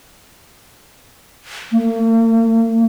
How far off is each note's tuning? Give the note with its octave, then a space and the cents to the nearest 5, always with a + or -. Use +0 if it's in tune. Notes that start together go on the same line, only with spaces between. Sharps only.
A#3 -45